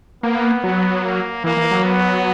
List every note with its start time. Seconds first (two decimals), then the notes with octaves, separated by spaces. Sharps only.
0.23 A#3 B3
0.64 F#3
1.04 A#3
1.44 E3 A#3
1.57 E3
1.71 F#3
1.84 B3